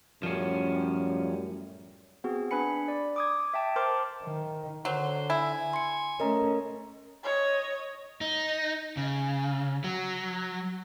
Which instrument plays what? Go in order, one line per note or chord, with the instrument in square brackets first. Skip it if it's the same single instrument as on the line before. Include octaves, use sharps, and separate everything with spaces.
[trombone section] F#2 A2 G3 [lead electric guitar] F3 C#4
[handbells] B3 C4 F#4 G#4
D4 B4 G#5 B5 C#7
D5
D6 D#6 G#6
E5 G5 A5
A#4 C5 A5 C6 D6 F6
[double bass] D#3
[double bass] D3 [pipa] F#3 [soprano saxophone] C5
[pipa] E4 [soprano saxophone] G#5
[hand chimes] C6 C#7
[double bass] A3 C#4 [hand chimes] A#4 D#5 A#5
[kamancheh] C#5 D#5
[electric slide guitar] D#4
C#3
F#3